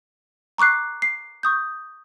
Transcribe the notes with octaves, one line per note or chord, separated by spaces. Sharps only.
A#5 C#6 D6 F#6 C7
C7
C#6 D#6 G6